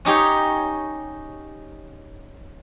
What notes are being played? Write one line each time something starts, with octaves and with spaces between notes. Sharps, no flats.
C#4 D#4 G4 C#5